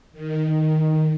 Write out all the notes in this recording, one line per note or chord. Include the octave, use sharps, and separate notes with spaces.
D#3